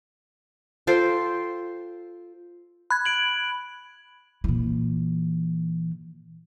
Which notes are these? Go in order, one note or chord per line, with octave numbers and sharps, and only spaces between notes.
F4 A4 C5 G5
B5 F#6 G#6
D7 F#7
A#2 E3